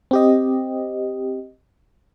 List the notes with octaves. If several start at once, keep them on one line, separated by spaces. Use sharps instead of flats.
C4 G4 D#5